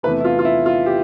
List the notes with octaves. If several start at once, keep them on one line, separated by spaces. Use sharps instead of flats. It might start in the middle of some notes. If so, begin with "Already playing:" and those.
E2 C3 E3 A3 B4
E4
F4
F4
E4
F4
G4